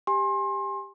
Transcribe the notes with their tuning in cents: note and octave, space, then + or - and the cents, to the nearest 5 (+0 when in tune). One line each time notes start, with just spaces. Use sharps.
G4 +10 G#5 -5 C6 +30